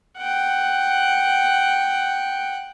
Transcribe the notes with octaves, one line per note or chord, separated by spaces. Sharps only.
F#5 G5